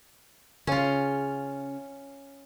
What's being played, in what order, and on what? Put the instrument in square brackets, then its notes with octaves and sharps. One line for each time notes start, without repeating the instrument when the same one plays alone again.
[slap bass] C#3 [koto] C#4 F4